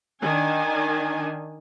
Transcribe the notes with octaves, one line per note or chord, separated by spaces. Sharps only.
D#3 D4 G#5